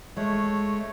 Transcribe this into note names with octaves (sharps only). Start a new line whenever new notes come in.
G#3 A3 C#5